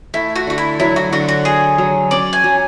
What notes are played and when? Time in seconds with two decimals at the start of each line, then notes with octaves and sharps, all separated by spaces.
0.14 A3 E4
0.36 F#4
0.47 D3 F#4
0.58 E4
0.80 F#3 E4
0.96 F#4
1.12 D3 F#4
1.29 F#4
1.45 F#4 G#4
1.78 F#3
2.11 C#4 D5
2.33 G#5
2.44 F#3